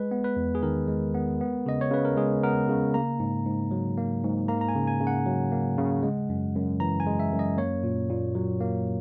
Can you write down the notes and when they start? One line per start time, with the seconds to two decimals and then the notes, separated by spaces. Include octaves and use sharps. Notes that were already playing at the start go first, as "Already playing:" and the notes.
Already playing: G#3 B4
0.11 B3
0.24 B4
0.37 E2
0.55 G#4
0.62 D#3 A#4
0.88 G#3
1.14 B3
1.41 B3
1.66 C#3 D#5
1.81 C#5
1.91 C#3 B4
2.05 A#4
2.17 G#3 G#4
2.44 B3 A#4
2.69 C#3
2.94 A#3 A#5
3.20 G#2
3.45 G#2
3.71 F#3
3.97 A#3
4.24 G#2
4.48 A#3 A#5
4.61 A#5
4.69 G#5
4.75 C#3
4.87 G#5
5.01 C#3
5.07 F#5
5.26 F#3
5.52 A#3
5.78 C#3
6.03 G#3
6.29 F#2
6.55 F#2
6.80 E3 A#5
7.00 G#5
7.06 G#3
7.20 E5
7.32 F#2
7.39 D#5
7.57 A#3 C#5
7.83 A#2
8.10 A#2
8.35 F#3
8.61 A#3